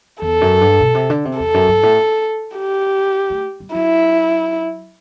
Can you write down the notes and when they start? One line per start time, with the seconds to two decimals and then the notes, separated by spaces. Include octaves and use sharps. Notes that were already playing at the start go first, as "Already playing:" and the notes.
0.22 E2 A4
0.41 F#2
0.61 G2
0.80 B2
0.95 C3
1.10 D3
1.25 C3
1.39 E2 A4
1.54 F#2
1.68 G2
1.83 A2
2.56 G4
3.30 A3
3.60 G3
3.75 F#3 E4